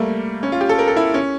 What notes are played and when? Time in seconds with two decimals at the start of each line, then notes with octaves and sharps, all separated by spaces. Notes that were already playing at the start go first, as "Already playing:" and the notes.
Already playing: G3 A3 A#3
0.43 C#4
0.52 F4
0.61 G4
0.69 A4
0.78 A#4
0.88 A4
0.97 E4
1.14 C#4